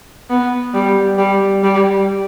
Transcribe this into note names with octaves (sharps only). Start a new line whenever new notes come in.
B3
G3
G3
G3